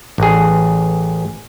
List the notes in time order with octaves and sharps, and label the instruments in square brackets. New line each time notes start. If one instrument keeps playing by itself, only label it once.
[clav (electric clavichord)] A1 G#4